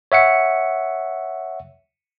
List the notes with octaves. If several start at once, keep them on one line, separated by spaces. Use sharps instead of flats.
C#5 E5 F#5 C#7